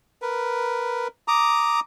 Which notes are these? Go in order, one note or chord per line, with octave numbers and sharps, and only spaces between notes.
A#4 B4
A#5 D6 D#6